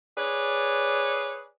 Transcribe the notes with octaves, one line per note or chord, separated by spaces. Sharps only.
G#4 B4 C#5 D5